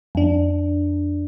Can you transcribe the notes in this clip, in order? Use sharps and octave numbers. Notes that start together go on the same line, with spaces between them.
F2 D4